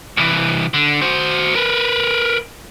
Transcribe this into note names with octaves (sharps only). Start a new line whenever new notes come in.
C2 E3
D3
F#4 C5
A#4 B4